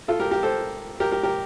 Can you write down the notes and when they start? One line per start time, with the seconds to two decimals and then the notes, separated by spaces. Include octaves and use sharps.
0.08 F4 A4
0.20 G4 A#4
0.31 G4 A#4
0.43 A4 C5
1.00 G4 A#4
1.11 G4 A#4
1.23 G4 A#4